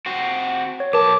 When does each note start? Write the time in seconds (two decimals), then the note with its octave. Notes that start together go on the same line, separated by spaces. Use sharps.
0.06 C4 F#4
0.80 C#5
0.93 B1 A4 A#4 A5 D6